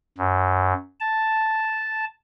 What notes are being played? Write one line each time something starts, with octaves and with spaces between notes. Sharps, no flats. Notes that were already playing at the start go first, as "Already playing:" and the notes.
F#2
A5